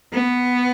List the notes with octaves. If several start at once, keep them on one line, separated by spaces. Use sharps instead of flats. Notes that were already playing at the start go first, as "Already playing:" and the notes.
B3